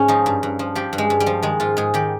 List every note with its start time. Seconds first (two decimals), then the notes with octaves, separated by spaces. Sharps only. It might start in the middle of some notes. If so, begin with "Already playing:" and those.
Already playing: G#2 C#4
0.08 F3 D#4
0.26 G2
0.43 G2
0.59 F3
0.75 F3 G4
0.93 G2
0.98 G#3
1.10 G2
1.20 G3
1.26 F3
1.42 D#3 G#3
1.60 G#2 F4
1.77 G#2 G#4
1.94 D#3 G4